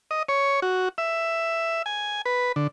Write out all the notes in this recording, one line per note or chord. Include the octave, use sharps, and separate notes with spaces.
D#5
C#5
F#4
E5
G#5
B4
D3